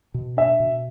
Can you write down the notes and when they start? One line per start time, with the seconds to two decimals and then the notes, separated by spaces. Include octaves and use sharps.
0.14 B2
0.37 D4 E5
0.60 B2